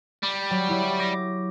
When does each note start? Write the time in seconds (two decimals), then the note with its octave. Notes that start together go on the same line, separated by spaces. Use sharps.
0.23 G3
0.51 F#3
0.68 F#3 E4 G4
0.99 D6 A#6